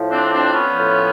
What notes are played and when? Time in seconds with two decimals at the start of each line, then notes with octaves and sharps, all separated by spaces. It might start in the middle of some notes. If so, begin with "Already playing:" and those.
Already playing: A2 F3
0.10 C4 D4
0.32 C4 D4
0.53 B3 C#4
0.74 A2 F3